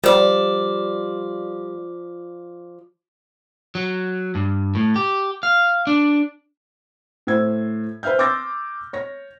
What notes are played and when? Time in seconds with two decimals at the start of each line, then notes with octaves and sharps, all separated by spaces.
0.04 F3 G3 D5
3.75 F#3
4.35 G2
4.75 A2
4.96 G4
5.43 F5
5.87 D4
7.27 A2 C5 E6 G#6
8.03 B4 C5 E5 F6 G6
8.19 C6 D6 E6 G6 A6 A#6
8.93 C#5 A#6